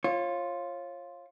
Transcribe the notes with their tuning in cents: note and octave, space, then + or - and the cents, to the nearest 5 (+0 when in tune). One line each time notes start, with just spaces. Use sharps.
F4 +0 C#5 -30